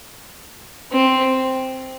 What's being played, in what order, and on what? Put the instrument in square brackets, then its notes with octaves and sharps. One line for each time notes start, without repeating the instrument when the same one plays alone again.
[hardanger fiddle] C4